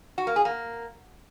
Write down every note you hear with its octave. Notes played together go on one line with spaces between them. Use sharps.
F#4
A#3
G#4
A#3